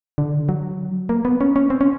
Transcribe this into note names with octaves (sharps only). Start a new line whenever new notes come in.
D3
F#3
A#3
B3
C#4
C#4
C4
C#4